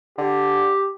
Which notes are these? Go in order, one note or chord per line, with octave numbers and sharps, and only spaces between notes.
D3 G4